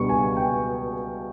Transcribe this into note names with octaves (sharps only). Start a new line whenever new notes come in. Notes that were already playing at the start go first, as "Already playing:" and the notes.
Already playing: C#2 B2 G3 B3 D4 C#6
G#5
G5